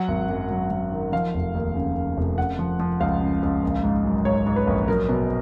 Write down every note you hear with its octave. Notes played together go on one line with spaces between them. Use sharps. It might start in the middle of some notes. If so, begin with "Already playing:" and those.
Already playing: F#3 F#5
G#1
F#2
F#3
F#3
D#3
F3 F5
F1
D#2
C#3
C#3
F1
C#3 F#5
F3
F3
C#2 F5
C#3
C#2
A#1
G#2
F#3
G#2 C#5
G#2
B4
A#1
F#3 A#4
B2